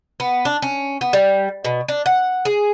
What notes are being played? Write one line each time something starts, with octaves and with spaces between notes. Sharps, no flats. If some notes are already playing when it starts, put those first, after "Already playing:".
B3
D4
C#4
B3
G3
B2
D4
F#5
G#4